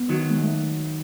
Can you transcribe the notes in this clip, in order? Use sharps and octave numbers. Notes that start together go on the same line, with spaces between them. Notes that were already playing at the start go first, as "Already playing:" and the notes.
Already playing: B3
D#3 F#3
G#3
A3